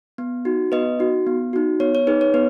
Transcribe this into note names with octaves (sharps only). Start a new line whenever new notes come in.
B3
D#4 F#4
B3 B4 D#5
D#4 F#4
B3
D#4 F#4
B3 C#5
C#5
D#4 G#4 B4
C#5
B3 B4